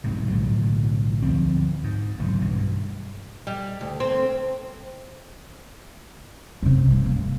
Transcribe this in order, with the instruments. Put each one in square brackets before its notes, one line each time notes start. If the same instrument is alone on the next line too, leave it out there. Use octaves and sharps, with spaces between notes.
[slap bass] B1 G#2 C3
B1 A2 D3 F#3
D2 F3 C4
G#2
F#1 B1 G#2 D3
G2 B2 E3
[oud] G3
D2
C4
[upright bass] F#2 C3
E3 G3
A#3